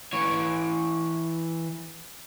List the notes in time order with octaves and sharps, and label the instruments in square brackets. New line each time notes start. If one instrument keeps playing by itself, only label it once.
[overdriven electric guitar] E3 C#5